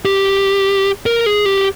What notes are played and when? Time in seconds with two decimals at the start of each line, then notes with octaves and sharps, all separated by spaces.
0.05 G4
1.06 A#4
1.26 G#4
1.45 G4